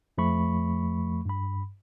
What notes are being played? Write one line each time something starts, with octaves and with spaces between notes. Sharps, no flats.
F2 F3 A3 B5 C#6
G2 B5